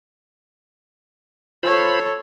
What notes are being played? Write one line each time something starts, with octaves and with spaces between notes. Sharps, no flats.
F4 A4 C5 C#5 B5